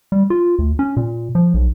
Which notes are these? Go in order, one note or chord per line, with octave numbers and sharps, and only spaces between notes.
G3
F4
D2
C#4
A#2
F3
B1